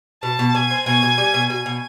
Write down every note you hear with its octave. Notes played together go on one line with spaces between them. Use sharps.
B2 A5
B2
B2 G#5
C4
B2 G#5
B2
G3
B2
B2 G#5
B2